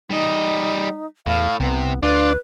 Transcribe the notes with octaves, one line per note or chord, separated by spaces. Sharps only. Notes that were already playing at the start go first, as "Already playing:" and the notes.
G3 D#4 D#5
E2 A2 F5
C2 C3 B3
D2 D4 F4 B4